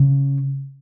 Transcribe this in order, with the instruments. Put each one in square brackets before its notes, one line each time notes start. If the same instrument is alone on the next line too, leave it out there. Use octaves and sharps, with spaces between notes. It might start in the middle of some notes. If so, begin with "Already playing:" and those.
Already playing: [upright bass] C#3